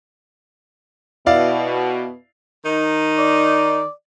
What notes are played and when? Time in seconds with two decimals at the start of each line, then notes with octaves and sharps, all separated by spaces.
1.26 B2 E4 D5 F5
2.65 D#3 D#4
3.18 D5